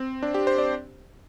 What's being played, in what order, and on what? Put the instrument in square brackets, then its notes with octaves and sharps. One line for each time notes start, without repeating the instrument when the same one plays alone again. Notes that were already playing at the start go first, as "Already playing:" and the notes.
Already playing: [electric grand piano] C4
D4
G4
C5
D5